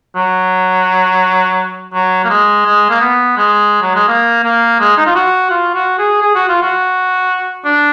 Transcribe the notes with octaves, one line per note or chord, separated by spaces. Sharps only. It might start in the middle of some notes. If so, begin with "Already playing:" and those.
F#3
F#3
A#3
G#3
G#3
A#3
B3
G#3
F#3
G#3
A#3
A#3
G#3
D#4
F4
F#4
F4
F#4
G#4
G#4
F#4
F4
F#4
D4